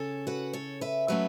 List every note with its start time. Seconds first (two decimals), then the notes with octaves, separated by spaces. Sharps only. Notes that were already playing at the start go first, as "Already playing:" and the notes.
Already playing: C#3 C#4 A4 C#5
0.27 F#4 B4
0.53 A4 C#5
0.81 B4 E5
1.08 F#3 A3 C#4 B4 E5